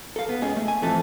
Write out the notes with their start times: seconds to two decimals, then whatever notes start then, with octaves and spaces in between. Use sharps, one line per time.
0.16 A4 F5
0.29 B3
0.42 C#2 C#3 G#4 D#5
0.56 A3
0.68 G#5
0.82 E3 F3 A3 C4 A4